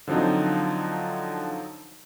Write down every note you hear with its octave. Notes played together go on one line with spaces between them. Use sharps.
D3 F3 F#3 C4 D#4